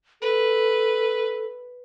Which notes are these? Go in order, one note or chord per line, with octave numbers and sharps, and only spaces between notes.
A4 B4